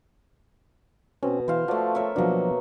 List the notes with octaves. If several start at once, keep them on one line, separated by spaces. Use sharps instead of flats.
B2 C4 C#4
E3 C5 F5
F3 A3 F#4 D5
A#4 C#5 E5
B2 F3 F#3 A#3 D4